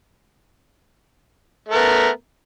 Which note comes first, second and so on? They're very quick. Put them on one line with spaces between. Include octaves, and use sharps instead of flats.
A3 A#4 B3